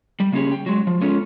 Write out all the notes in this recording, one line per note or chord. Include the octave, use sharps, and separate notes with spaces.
G3
C#3 A#3 C#4 G4 G#4
G5
F#3 G#3
F3
G#3 B3 C#4 F4 A4